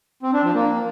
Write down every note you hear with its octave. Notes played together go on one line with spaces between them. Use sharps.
C4
D4
F3
A#3